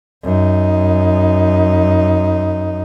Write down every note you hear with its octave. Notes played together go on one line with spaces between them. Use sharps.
F#2 D#4